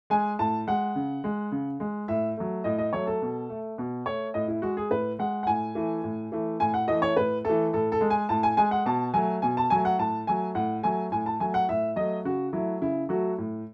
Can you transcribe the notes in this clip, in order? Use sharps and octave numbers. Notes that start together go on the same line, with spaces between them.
G#3 G#5
A2 A5
G#3 F#5
C#3
G#3
C#3
G#3
A2 E5
F#3 A3
A2 D#5
D#5
F#3 A3 C#5
A4
B2
A3
B2
A3 C#5
A2 D#5
E4
G#3 F#4
G#4
A2 B4
G#3 F#5
F#5
A2 G#5
E3 A3
A2
E3 A3
A2 G#5
F#5
E3 A3 D#5
C#5
A2 B4
E3 A3 A4
A2 A4
A4
G#3
G#5
A2 A5
G#5
G#3 G#5
F#5
B2 A5
F#3 A3 G#5
B2 G#5
A5
F#3 A3 G#5
F#5
A2 A5
F#3 A3 G#5
A2 F#5
F#3 A3 G#5
A2 G#5
A5
F#3 A3 G#5
F#5
A2 E5
F#3 A3 D#5
C#3 F#4
F#3 A3 E4
C#3 E4
F#3 A3 F#4
A2